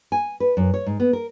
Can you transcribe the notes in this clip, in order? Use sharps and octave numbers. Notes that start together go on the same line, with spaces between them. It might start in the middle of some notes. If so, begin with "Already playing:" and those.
G#5
B4
F#2
C#5
G#2
B3
A#4